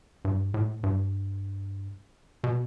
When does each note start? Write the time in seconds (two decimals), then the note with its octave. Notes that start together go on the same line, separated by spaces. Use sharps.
0.25 G2
0.54 A2
0.83 G2
2.44 B2